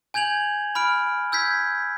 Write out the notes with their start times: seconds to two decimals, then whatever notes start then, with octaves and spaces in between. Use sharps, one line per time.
0.14 G#5 G6 G#6 F7 F#7
0.75 B5 F6 D7
1.32 E6 G6 G#6 B6